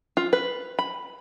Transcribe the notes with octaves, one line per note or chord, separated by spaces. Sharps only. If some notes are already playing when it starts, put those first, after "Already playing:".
F4
B4
B5